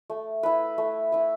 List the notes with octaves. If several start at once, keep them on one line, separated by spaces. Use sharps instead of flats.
A3
E4 B4
A3
E4 B4